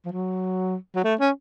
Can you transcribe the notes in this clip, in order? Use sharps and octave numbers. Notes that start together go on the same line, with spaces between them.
F3
F#3
F#3
A3
C#4